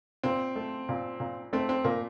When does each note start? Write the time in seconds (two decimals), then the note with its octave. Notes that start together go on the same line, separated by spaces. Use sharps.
0.23 A#2 C4
0.56 A3
0.89 A#2
1.20 A#2
1.53 A3 C4
1.69 C4
1.84 A#2 A#3